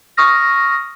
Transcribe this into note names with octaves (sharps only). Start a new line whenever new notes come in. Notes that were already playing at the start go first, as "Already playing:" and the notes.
C#6 D#6 F6 A#6